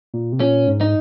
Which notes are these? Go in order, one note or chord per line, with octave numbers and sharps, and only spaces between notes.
A#2
C3
A#2 C#4
G#2
D#4